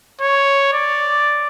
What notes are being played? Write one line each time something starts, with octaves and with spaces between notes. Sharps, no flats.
C#5
D5